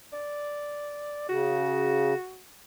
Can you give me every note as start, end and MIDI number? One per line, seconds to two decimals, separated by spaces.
0.13 1.27 74
1.29 2.14 49
1.29 2.41 66